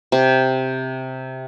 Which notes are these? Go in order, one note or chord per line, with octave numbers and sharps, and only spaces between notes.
C3